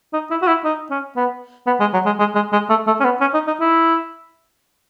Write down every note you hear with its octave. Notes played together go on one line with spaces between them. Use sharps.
D#4
E4
F#4
E4
D#4
C#4
B3
B3
G#3
F#3
G#3
G#3
G#3
G#3
A3
A3
C#4
B3
C#4
D#4
D#4
E4